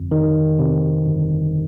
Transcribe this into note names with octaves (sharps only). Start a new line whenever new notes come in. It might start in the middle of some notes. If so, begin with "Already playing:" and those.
Already playing: G1 F2
D#3
C3
G1